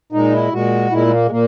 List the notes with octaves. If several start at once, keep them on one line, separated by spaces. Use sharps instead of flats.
A#2 G#3 D#4
E4
A#2 G#3 F#4
A#2 G#3 E4
G#3
A#3
G#3
A#2 A#3